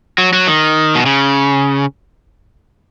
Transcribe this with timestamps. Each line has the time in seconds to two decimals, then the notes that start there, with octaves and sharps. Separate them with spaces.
0.18 F#3
0.33 F#3
0.47 D#3
0.95 B2
1.06 C#3